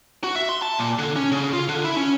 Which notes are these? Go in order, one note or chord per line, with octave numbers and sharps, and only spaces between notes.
F#4
E5
C6
A5
A#2
D3
C#4
C#3
F4
D3
E4
C#4